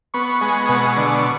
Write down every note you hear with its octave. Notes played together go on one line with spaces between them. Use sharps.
B3 C#6
G#3
B2
D3